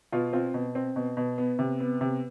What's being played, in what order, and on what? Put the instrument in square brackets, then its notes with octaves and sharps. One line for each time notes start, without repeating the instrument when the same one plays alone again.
[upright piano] B2 F4
C4 F4
B2
C4
B2
B2
B3
C3
B3
C3